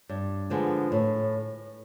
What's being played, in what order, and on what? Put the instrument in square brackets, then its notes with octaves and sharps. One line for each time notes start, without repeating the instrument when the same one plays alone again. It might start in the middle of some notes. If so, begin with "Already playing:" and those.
[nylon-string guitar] G2
D3 F3 G#3 B3
A2